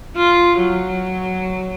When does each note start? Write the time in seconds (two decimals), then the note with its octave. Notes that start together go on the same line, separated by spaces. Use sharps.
0.16 F4
0.60 F#3